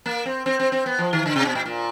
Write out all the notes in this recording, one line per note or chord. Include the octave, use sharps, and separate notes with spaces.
A#3
C4
C4
C4
C4
B3
F3
D#3
D3
C3
B2
A#2
A#2